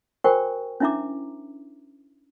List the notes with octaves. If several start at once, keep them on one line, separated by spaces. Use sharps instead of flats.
F#4 A#4 C5 G5 G#5 C#6
C#4 D4 E4 E5 A#5 D6